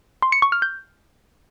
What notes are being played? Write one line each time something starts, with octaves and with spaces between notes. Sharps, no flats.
C6
C#7
C#6
F6
G6